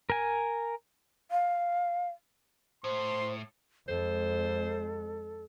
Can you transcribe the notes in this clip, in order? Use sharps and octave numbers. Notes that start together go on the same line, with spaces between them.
A#4 G#5
F5
A2 C5 C6
F2 G#3 A4 C5